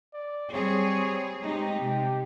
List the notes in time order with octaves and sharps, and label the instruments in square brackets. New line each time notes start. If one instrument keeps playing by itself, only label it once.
[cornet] D5
[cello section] G3 C4 G#4 [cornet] C#5
[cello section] G#3 C4 D#4 [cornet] G4
[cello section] C3